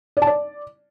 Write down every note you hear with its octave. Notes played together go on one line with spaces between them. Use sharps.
D5
A5
D5